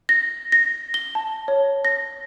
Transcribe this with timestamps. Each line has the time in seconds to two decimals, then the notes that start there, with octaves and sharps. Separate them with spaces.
0.09 A#6
0.52 A#6
0.94 G7
1.15 A5
1.48 C#5
1.85 A#6